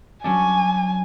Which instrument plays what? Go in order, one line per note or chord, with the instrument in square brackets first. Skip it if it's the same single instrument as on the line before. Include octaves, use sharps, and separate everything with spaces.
[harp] F#3 C#4 D4 [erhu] G#5